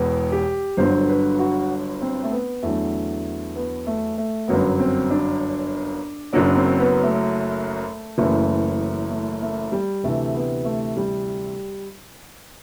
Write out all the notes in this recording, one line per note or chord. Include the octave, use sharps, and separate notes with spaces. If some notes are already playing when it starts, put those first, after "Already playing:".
Already playing: E1 E2 B3
G4
G1 G2 D3 F#3 C5
B4
F#4
C4
A3
B3
E2 D3 F#3 A3
B3
A3
A3
G1 F#2 F#3 B3
C4
D4
F#1 F#2 F#3 D4
C4
B3
A3
F#1 F#2 E3 A3
A3
A3
G3
D2 C3 E3 A3
B3
A3
G3